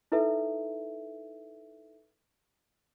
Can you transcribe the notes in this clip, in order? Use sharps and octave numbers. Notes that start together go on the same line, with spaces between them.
D#4 E4 A4 B4 E5